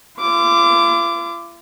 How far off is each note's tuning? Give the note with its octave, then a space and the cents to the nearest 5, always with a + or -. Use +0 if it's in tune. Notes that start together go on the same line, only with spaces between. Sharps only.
F4 -45 D6 +0